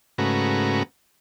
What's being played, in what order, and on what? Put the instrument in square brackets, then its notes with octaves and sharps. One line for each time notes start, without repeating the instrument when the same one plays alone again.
[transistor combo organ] G#2 C#3 A3 F#4 B4 A#5